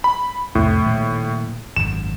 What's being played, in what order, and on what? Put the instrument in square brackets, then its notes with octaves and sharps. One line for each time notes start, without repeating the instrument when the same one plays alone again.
[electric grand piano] B5
[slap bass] C2 F2 C4 [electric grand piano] A2
[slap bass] A#2 D#3 F3
[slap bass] G#1 F#2 [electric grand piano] E7